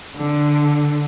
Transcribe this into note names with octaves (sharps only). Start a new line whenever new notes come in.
D3